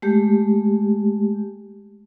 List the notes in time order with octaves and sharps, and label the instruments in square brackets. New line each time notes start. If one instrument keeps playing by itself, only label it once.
[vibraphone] G#3 A3 G4